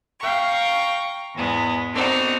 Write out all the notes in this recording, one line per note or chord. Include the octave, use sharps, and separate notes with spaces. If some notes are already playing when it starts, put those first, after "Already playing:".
F5 G5 A#5 C#6
E2 G#2 G#3 B3
B3 C4 D4 D#4 F#4 A4